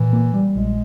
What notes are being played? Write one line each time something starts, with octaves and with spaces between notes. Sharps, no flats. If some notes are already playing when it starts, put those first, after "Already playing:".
Already playing: A#2 E3
A#3
G3
A#1 G#3